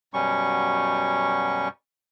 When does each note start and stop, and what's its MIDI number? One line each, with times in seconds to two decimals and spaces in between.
0.14 1.69 42
0.14 1.69 47
0.14 1.69 55
0.14 1.69 61
0.14 1.69 85